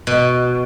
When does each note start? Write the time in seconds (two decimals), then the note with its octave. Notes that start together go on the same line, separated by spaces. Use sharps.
0.07 B2